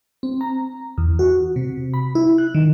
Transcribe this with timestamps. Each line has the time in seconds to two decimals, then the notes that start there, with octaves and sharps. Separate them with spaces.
0.23 C4
0.41 A#5
0.98 E2
1.19 F#4
1.56 C3
1.94 B5
2.15 E4
2.38 F#6
2.55 D#3